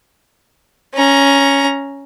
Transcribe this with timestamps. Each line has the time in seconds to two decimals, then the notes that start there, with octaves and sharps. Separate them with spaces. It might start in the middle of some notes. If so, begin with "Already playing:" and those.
0.94 C#4 A#5